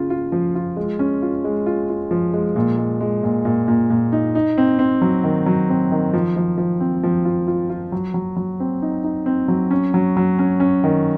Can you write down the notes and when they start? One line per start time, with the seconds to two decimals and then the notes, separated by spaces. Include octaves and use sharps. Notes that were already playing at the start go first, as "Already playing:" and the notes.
Already playing: C#3 F4
0.10 F4
0.32 F3
0.55 F4
0.77 G#3
0.99 C#4
1.22 F4
1.44 G#3
1.66 F4
1.89 F4
2.11 F3
2.34 G#3
2.56 A#2
2.78 G#3
3.01 G#3
3.23 A#2
3.45 A#2
3.68 A#2
3.90 A#2
4.12 D#4
4.35 D#4
4.58 C4
4.79 C4
5.02 F#3
5.24 D#3
5.46 F#3
5.69 C4
5.92 D#3
6.13 F3
6.36 F3
6.58 F3
6.80 C4
7.03 F3
7.25 F4
7.47 F4
7.70 F4
7.92 F#3
8.14 F#3
8.36 F#3
8.60 C4
8.82 D#4
9.04 D#4
9.26 C4
9.48 F#3
9.71 C#4
9.94 F#3
10.17 F#3
10.39 C#4
10.60 C#4
10.84 D#3